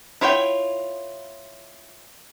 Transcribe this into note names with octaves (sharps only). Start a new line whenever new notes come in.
E4 F4 C#5 D5 G5